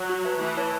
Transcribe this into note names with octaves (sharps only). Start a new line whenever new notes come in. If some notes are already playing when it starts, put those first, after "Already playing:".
Already playing: F#3
F#4
B4 E5 A5
E3 A3
E4 C#5 A5